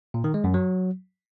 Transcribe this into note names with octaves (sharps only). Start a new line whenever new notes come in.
A#2
D#3
G#3
F#2
F#3